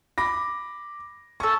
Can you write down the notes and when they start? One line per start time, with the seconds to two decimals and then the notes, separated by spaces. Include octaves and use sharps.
0.18 B5 D6 A#6
1.40 C#4 A4 C#6